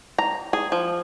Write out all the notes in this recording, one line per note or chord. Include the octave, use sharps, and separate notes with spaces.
A#5
G#4
F3